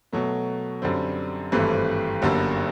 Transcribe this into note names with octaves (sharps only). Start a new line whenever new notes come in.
B2 F#3 A3
F#2 D3 G3 C4
G#1 G2 E3 A3 C4
G1 F#2 D3 G3 A#3